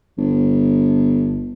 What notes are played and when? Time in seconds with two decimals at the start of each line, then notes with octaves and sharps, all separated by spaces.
0.18 G1